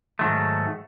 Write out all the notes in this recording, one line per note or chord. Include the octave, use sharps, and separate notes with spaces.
G#2 D#3 F#3 A3